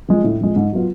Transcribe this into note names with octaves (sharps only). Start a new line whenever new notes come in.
F3 G#3
A2
F3 G#3
G#2
F#3 B3 F4